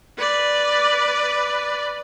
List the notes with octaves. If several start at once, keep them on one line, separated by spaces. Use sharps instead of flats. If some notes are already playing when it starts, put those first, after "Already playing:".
B4 D5